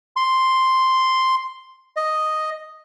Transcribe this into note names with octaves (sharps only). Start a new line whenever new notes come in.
C6
D#5